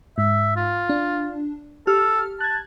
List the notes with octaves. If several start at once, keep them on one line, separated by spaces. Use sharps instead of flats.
G#2 E5
F4
D4
G4 A4 F6
A5 F#6 G#6